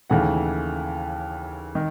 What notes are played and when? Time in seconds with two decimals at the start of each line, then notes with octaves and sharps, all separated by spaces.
0.10 D#2 C#3 E3 A3 F#5
1.75 D#3